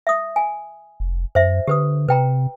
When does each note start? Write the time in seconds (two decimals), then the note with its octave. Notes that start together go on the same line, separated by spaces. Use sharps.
0.07 E5 D#6
0.36 G#5
1.00 F1
1.35 F#2 C5 E5
1.67 D3 G4 B4 D#6
2.08 C3 B4 G5 A#5